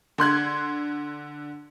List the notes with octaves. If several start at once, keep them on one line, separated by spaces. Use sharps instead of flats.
D3 C6 F#6 G#6